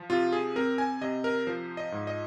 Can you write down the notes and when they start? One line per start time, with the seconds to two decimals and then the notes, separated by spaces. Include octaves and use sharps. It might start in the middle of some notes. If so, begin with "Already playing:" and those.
Already playing: F3
0.10 C3 F4
0.33 G#4
0.56 C4 A#4
0.78 G#5
1.01 C3 D#5
1.24 A#4
1.47 F3 C5
1.77 D#5
1.92 G#2
2.07 D#5